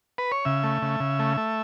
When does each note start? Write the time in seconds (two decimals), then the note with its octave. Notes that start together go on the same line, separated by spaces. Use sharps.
0.18 B4
0.32 C#5
0.45 C#3 E5
0.64 A3
0.82 C#3
1.00 C#3
1.19 A3
1.37 A3